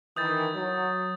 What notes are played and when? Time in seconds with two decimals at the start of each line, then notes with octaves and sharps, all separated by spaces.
0.17 D#3 E3 D#6 G6 A6
0.55 F#3